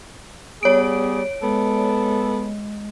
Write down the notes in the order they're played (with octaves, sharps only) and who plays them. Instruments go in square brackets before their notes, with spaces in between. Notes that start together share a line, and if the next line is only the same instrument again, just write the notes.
[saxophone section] G3 G#4 [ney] B3 [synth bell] C#5 D7
[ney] G#3 [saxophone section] B3 A4